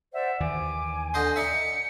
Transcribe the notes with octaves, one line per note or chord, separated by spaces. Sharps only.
C5 D5 E5 F#5
D#2 D#3 E3 G#5 D6
D3 D#5 C6 G6
D#4 D5 E5 C#7